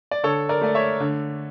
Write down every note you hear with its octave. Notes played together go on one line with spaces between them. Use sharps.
D5
D3 A4 C#5
A#4 D5
A3 D5
C#5 E5
D3